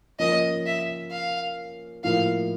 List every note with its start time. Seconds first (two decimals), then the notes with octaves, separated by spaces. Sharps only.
0.19 F3 A#3 C#4 D#5
0.66 E5
1.11 F5
2.04 A2 F3 A#3 F5